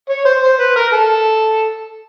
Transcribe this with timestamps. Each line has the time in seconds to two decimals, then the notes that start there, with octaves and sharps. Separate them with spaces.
0.09 C#5
0.25 C5
0.42 C5
0.60 B4
0.76 A#4
0.93 A4